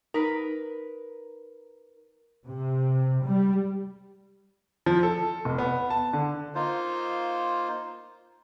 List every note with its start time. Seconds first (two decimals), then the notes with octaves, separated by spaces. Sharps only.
0.14 D#4 A#4 B4 B5
2.47 C3
3.23 G3
4.86 F3
5.03 A4
5.45 F1
5.58 B3
5.90 A5
6.13 D3
6.55 A#3 D#4 F4 C5